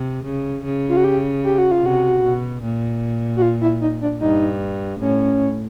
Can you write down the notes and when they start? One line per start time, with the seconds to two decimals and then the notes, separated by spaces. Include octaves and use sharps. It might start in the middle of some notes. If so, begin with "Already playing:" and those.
Already playing: C3
0.25 C#3
0.65 C#3
0.89 F4
0.97 F#4
1.04 G4
1.44 G4
1.58 F#4
1.71 F4
1.83 C3 F#4
2.23 B2
2.63 A#2
3.36 F#4
3.42 F4
3.61 E4
3.81 D#4
4.02 D4
4.21 G2 D#4
5.00 A2 C#4